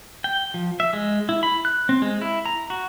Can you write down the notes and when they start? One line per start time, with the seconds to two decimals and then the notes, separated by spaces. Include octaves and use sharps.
0.24 G5
0.54 F3
0.80 E5
0.93 G#3
1.29 E4
1.43 B5
1.65 F#6
1.89 C4
2.02 G#3
2.21 E4
2.46 A#5
2.70 F#4